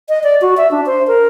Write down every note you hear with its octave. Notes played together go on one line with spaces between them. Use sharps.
D#5
D5
F#4
E5
D4
C5
A#4